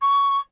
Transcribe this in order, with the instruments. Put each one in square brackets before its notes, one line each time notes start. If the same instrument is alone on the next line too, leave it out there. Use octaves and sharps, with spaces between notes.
[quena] C#6